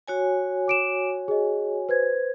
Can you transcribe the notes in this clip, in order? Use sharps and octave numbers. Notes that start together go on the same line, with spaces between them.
F#4 C#5 G#5
D6 D7 E7
G#4 D#5
B4 C5 G#6